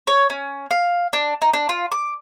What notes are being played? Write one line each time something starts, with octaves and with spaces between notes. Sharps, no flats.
C#5
C#4
F5
D4
D#4
D4
F4
D6